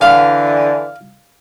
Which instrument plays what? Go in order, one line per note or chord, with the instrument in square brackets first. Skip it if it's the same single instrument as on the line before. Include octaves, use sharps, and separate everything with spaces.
[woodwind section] D3 E3 [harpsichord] F5